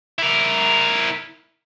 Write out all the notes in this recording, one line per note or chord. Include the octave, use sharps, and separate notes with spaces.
E4 A#4